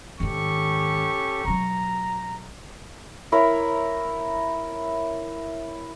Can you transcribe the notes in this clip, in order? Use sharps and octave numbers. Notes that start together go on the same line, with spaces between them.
G#2 D#3 C#4 G4 A4 C#6
B2 F#3 A#5
E4 A#4 C#5